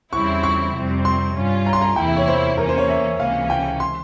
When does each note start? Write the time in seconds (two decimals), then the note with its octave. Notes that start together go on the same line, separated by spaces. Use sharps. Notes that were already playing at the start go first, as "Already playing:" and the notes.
0.13 E2 C#3 G3 C4 E4 C#6
0.43 C#6
0.74 F2 C3 G3 C4
1.05 C6
1.35 G2 G3 C#4 F4
1.66 A#5
1.73 C6
1.81 A#5
1.96 E2 C3 E3 A#3 E4 G5
2.07 E5
2.17 C#5
2.28 C5
2.57 E2 E3 A#3 C#4 A#4
2.69 C5
2.78 C#5
2.89 E5
3.19 C#2 C3 E3 A#3 C#4 F5
3.50 G5
3.80 C6